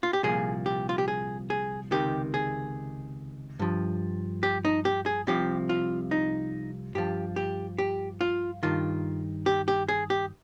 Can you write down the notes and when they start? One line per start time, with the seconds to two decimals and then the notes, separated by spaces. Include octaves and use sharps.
0.03 F4
0.13 G4
0.23 C2 A#2 F3 G#4
0.66 G4
0.89 F4
0.98 G4
1.08 G#4
1.50 G#4
1.91 C#2 C3 D#3 G4
2.34 G#4
3.59 G2 F3
4.43 G4
4.65 D#4
4.85 G4
5.06 G#4
5.27 C2 C3 F3 G4
5.69 F4
6.11 D#4
6.95 G2 F3 G4
7.36 G4
7.78 G4
8.21 F4
8.63 G2 D#3 F4
9.46 G4
9.68 G4
9.88 G#4
10.10 G4